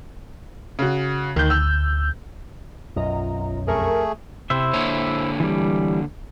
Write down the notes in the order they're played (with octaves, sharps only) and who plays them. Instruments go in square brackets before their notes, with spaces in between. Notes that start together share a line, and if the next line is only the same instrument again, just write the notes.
[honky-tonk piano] C#3 F#4
[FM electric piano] D2 G6 [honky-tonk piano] D#3
[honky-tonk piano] E6
[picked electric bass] B1 F#2 [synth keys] F4 D#5 A#5
[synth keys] F2 A#4 C#6 [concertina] A3 G#4
[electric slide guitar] C3 [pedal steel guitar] E4 C5 E5
[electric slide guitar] D3 A#3 C#5
[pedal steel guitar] E3 G3